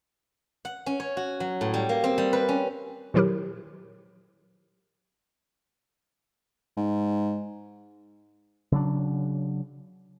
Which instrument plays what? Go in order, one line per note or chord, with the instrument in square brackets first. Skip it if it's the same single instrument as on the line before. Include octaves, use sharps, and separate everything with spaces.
[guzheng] F#5
C#4
C#5
F#4
F#3
A2
G3
A#3
C4
G3
B4
C#4
[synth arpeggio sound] A#2 D#3 F#3 E4 G4 A#4
[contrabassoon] G#2
[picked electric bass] C#3 F#3 D4